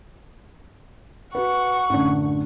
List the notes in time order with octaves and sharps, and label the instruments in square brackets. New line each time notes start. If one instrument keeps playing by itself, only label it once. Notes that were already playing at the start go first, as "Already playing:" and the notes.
[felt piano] F#4 B4 [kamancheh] F#5 C#6
[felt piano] A1 F#2 D3